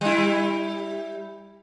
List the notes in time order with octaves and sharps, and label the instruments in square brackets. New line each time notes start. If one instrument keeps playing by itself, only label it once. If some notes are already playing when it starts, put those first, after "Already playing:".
[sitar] G3 E4